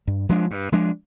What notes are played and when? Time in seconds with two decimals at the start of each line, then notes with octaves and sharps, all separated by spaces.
0.07 G2
0.29 F3 G#3 D4
0.51 G2
0.72 F3 G#3 D4